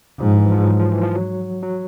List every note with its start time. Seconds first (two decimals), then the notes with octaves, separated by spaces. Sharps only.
0.20 G#2 F3
0.36 E3
0.52 F3
0.67 F#3
0.80 F3
0.92 E3
1.03 F3
1.15 F#3
1.63 F#3